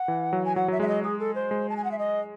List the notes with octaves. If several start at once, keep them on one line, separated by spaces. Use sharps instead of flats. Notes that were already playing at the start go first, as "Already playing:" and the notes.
Already playing: F#5
E3
F#3
G#5
F#3 F#5
F#3 E5
G#3 E5
D#5
G#4
A4
C5
G#3
A5
G#5
F#5
E5
D#5